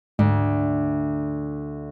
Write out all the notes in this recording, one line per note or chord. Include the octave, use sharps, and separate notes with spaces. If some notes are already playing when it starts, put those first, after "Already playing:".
D2 G#2